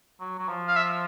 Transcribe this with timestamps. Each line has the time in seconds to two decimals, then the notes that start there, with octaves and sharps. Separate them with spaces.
0.20 F#3
0.39 F#3
0.48 F3
0.68 F5
0.76 E5